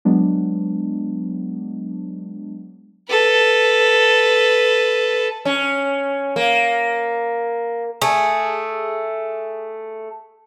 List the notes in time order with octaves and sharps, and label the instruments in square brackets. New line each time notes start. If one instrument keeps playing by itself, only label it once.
[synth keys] F#3 G#3 B3 D4
[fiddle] A4 B4
[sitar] C#4
A#3
[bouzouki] A3 G#4